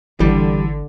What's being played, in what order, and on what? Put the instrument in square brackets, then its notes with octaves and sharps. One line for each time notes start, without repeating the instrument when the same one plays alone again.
[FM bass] G#1 [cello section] D3 [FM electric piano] E3 [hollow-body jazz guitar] G3